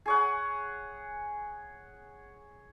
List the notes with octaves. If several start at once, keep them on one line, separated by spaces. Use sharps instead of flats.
G#4 C#5 F#5